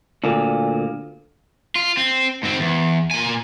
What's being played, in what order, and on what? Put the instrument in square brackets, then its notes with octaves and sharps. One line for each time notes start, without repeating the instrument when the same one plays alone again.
[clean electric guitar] D2 A#2
[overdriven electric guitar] F4
C4
G#2 C4
E2
A#2 G#5